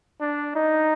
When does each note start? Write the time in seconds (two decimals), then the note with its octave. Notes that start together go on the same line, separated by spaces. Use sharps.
0.21 D4
0.56 D#4